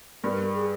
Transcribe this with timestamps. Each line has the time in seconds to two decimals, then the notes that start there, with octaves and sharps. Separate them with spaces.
0.24 G2 A#4
0.55 G#4